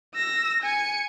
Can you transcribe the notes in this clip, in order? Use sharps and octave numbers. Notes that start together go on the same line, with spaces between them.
E6 A#6
G#5 C#7